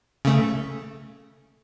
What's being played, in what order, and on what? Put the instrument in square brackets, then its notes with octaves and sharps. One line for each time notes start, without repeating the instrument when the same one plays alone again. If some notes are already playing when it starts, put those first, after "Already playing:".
[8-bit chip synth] C#3 A3